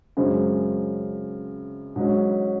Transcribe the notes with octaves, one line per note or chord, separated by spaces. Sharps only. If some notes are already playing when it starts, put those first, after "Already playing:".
F#2 C#3 G#3 C4
G#2 F#3 C#4